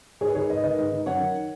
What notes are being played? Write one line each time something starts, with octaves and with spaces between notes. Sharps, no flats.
G#2 G#4 C#5
B4
D#3 G#4 C#5
G#2 B4 D#5
D#3 B4 D#5
G#2
D#3
F#2 C#5 F#5
D#3